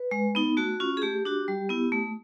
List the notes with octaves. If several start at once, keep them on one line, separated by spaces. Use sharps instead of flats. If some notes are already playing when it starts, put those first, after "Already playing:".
Already playing: B4
G#3
B3 D#4
A3 F#4
C#4 F4
G#4
A3 G4
D4 F#4
G3
B3 E4
A3